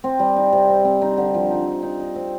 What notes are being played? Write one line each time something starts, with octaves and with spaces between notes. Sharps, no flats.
C4
G3
D#4
C3
C4
C4
D#4
D3
F3
D#4
D#4
D#4
D#4
C4